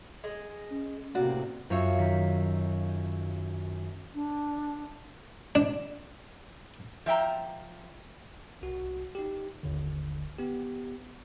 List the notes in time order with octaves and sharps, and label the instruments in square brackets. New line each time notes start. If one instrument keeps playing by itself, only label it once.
[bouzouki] G#3
[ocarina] C#4
[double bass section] A2 C3 A#3 [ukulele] F#4 [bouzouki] D5
[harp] F#2 F4 C#5 E5
D#3 B6
[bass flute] D4
[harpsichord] D4
[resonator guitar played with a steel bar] F3 E5 G5 A#5
[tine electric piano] C2 F#4
D#4 G4
G1 D#2 D3
B3 G4